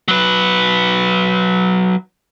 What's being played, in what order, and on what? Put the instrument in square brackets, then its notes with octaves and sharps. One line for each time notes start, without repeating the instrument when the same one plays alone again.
[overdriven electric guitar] F#3 B4